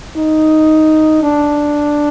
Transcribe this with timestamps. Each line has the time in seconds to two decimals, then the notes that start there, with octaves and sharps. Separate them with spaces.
0.17 D#4
1.23 D4